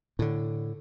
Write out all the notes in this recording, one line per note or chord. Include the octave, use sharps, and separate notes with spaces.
A2 D3